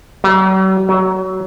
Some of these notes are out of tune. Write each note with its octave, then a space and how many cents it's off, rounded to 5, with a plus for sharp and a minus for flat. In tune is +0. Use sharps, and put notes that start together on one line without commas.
F#3 +45
F#3 +20